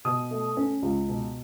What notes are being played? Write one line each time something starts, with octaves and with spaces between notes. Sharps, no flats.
B2 D#6
A3
C#4
C#2
B2